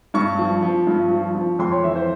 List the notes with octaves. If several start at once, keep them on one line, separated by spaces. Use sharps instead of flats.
G2 C#6
F3
F3
G2
F3
F3
F2 C6
C#5
E3 E5
C5